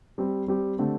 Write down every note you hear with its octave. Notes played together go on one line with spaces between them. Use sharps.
G3 C4 G4
G3 C4 G4
D3 A3 C4 G4